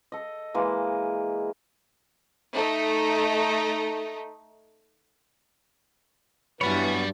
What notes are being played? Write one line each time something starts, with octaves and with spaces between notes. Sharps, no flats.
A4 D#5
E3 G#3 A#3
A3 D#4
G2 E3 F#3 B3 B4 C#5 D5 B5